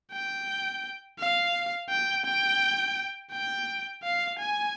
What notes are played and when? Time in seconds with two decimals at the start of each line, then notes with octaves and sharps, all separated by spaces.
0.12 G5
1.19 F5
1.90 G5
2.25 G5
3.32 G5
4.03 F5
4.39 G#5